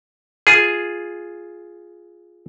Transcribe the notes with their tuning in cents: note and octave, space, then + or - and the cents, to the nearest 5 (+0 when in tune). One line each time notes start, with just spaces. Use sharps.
F4 +0 G#4 +0